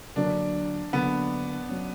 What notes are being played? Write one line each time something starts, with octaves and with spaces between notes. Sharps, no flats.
D3 F#3 A#3 D4
D3 F#3 A#3 B3
F#3 C#4